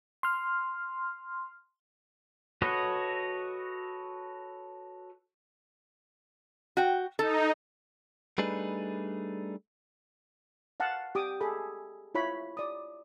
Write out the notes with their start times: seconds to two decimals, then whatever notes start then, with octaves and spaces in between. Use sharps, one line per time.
0.23 C6 F6
2.62 F#4 A4 B4 C#5 D#5
6.77 F#4 G5
7.19 D#4 A4
8.38 G3 A3 D4 D#4 G#4 B4
10.80 F5 F#5 A5
11.15 G4 D6 D#6
11.40 G#4 A4 B5
12.15 E4 F4 C#5 B5
12.57 D5 D#6